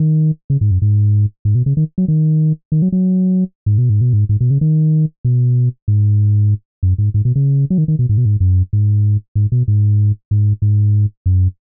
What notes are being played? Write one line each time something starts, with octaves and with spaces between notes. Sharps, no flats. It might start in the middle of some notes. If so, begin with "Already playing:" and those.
Already playing: D#3
C#3
G#2
F#2
G#2
G#2
B2
C#3
D#3
F#3
D#3
D#3
F#3
F#3
G#2
B2
G#2
B2
G#2
G#2
B2
C#3
D#3
B2
G#2
F#2
G#2
G#2
B2
C#3
F#3
D#3
D#3
B2
G#2
B2
G#2
F#2
G#2
G#2
B2
G#2
G#2
G#2
F#2